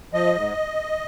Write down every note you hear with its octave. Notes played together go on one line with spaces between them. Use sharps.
F3 D#5
G#2